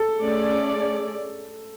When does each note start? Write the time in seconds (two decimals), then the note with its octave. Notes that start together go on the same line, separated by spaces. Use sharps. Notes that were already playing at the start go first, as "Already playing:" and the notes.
Already playing: A4
0.20 A3 C#4 G#4 D5